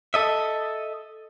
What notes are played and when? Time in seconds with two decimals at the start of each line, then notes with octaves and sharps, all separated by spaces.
0.14 A4 D#5 E5